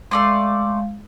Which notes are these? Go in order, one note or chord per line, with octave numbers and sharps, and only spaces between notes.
G#3 A3 D5 F5 C6